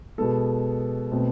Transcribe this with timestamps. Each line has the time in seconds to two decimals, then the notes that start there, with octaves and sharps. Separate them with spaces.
0.18 B2 G#3 B3 A4
1.12 B2 A3 C4